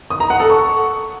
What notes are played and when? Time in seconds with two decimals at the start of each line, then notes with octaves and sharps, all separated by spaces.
0.10 D#6
0.20 A#5
0.30 F#5
0.40 A4
0.50 C#6